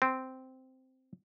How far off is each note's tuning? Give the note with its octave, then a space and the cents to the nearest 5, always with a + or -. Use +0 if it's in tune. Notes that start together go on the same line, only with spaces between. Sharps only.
C4 -10